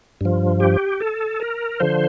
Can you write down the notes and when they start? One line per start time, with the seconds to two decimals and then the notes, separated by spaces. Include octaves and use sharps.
0.21 G2 F3
0.60 G4
1.00 A4
1.40 A#4
1.80 D3 F3 C5